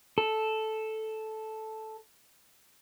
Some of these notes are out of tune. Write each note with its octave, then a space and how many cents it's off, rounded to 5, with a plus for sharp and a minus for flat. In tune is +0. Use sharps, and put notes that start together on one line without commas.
A4 -5